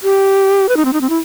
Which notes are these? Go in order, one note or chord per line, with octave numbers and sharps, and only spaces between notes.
G4
B4
D#4
C4
D#4
C4
E4